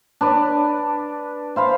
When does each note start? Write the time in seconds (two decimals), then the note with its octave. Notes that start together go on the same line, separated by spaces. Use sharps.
0.21 D4 B4 D5
1.56 C5 F5 B5